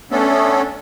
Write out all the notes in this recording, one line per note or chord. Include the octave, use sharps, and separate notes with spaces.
A3 B3 C#4 D4 A4